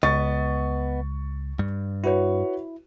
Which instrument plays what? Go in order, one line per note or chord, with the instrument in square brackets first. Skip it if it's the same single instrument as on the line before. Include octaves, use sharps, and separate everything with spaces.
[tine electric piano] C#2 [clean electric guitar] B3 D#5 [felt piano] C#6 A6
[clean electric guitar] G2
[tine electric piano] E4 [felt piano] F#4 B4 C#5